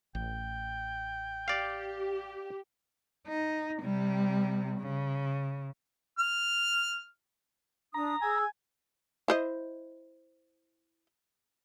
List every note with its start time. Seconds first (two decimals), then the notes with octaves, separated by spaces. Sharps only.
0.15 A1 G5
1.48 G4 D5 F5
3.27 D#4
3.80 C3 G3
4.79 C#3
6.19 F6
7.94 D4 A#5 D#6
8.22 G#4 G#5 E6
9.28 E4 C5 D#5